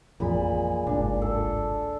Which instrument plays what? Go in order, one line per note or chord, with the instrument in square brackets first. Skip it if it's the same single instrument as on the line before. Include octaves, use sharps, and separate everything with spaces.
[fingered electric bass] A1 F2 [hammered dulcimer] A#2 G#3 B5
[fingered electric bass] G1 C2 G#2 [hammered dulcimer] D4
[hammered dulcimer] A4